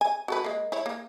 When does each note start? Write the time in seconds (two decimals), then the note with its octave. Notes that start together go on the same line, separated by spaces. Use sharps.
0.01 G#5
0.28 F#4 A4 B4
0.44 G#3 A#3
0.72 E4 C#5
0.86 A#3